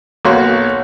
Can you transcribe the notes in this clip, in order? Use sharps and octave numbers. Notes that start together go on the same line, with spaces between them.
B1 A#3 F#4 C#5 C6